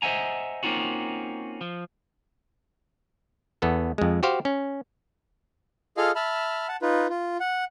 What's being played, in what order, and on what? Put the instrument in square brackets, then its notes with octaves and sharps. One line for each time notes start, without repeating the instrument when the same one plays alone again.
[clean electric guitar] C5 D#5 E5 F#5 G#5 A#5
A#3 C4 C#4 D#4 F4 F#4
F3
[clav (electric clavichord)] E2 B3 A4
F2 G#3
F#4 G4 C5 F5
C#4
[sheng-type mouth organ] F4 G#4 A4 D#5 F5 F6
E5 A5 B5 F6
F#5 A5
D#4 F4 B4
F4
F#5